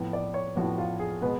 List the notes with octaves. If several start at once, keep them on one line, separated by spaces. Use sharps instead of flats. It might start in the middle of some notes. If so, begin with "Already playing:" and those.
Already playing: A2 F3 B3
D5
C#5
A2 F3 B3 F#4
F4
G#4
B2 G#3 B3 B4